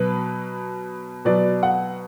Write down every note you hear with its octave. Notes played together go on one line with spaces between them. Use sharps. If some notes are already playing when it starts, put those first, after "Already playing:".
Already playing: B2 F#3 B3 B4
B2 F#3 B3 D5
F#5